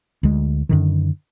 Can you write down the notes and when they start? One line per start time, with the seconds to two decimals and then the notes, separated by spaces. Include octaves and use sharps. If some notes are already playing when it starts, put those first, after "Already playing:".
0.23 D2 G#3
0.69 F#2 D3 D#3